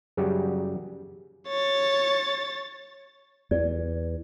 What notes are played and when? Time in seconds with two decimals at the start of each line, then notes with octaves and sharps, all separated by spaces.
0.17 F#2 C#3 F#3 G3 G4
1.48 C#5 A6
3.51 E2 D5